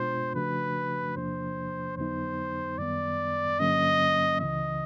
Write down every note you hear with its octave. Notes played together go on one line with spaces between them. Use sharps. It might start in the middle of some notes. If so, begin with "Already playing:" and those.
Already playing: B2 G#3 B3 D4 F4 C5
C#3 F3 A3 D4 F#4 B4
E2 C3 F3 A#3 D4 C5
F2 D3 F#3 B3 D#4 C5
F#2 D#3 G3 B3 D5
G2 D3 F#3 A#3 C#4 D#5
C#2 C#3 E3 D#5